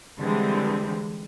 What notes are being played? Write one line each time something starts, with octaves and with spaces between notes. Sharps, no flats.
D3 E3 G3 G#3 C4